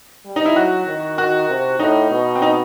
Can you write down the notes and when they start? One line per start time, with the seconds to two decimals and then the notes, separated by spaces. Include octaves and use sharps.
0.26 G3
0.36 D#4
0.46 E4
0.56 F#3 F#4
0.87 D#3
1.18 D#3 F#4
1.49 C3
1.79 A2 D#4
2.10 B2
2.35 C4
2.42 D#4